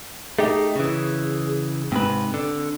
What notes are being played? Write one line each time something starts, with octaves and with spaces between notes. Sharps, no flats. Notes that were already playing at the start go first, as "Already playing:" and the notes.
A3 D#4 G4 G#4
C#3 E3
G#2 C3 C4 B4
D3